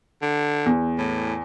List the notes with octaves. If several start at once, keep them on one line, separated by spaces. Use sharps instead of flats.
D3
E2
A2